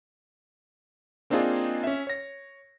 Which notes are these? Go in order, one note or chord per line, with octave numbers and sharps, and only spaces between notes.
A#3 C4 D4 D#4 F4 G#4
C#4 E5
C#5 A#6